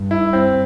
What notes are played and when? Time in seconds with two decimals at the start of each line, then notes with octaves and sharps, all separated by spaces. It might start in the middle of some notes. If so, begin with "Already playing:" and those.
Already playing: G2
0.11 E4
0.33 C4